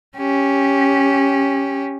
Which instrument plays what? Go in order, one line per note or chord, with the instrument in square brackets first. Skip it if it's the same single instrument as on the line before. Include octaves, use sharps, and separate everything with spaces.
[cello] C#4 G4